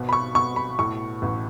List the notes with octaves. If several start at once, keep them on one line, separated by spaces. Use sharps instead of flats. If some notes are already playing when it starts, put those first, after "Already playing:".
Already playing: G#1 B2
B5
C#6
B2 C#6
B5
A2 C#6
A1